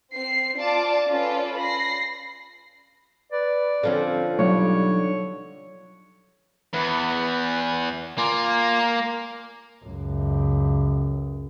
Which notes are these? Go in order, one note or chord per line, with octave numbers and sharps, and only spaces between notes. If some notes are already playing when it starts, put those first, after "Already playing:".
C4 C7
F4 D5 A5 D6
C#4 F4 A4 B4 D5
B5 A#6 C7
B4 D5
D3 F3 C4 C#4
B1 G3 C#5
E2 B4
A#3 F4 D5 G#5
C#2 F#2